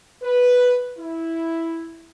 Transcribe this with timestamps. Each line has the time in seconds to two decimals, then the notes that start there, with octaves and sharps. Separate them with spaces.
0.22 B4
0.98 E4